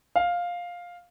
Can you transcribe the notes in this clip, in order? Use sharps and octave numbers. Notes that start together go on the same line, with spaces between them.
F5